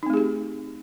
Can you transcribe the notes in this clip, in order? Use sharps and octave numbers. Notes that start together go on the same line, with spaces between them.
A3 C4 D#4 G4 G#4